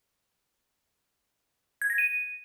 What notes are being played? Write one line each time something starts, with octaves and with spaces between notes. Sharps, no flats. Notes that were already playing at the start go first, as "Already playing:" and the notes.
G#6
A#6
D#7